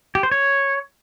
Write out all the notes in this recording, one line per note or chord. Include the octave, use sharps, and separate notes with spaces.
G4
C5
C#5